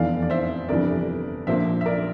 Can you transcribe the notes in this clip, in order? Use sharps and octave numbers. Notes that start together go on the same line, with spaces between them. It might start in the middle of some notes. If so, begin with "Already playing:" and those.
Already playing: F1 E2 E3 D5 F5
D5
C5 E5
G1 F2 C3 E3 A#4 D5
A#1 A#2 F3 A#3 C5 E5
E5
A#4 D5